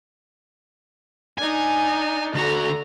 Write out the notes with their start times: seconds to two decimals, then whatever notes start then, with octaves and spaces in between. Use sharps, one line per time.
1.38 D4 D#4 G#5
2.35 D2 D3 F#4 A#5